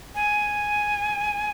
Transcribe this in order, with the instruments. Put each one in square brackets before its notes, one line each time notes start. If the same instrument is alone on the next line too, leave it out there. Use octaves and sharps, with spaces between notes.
[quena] G#5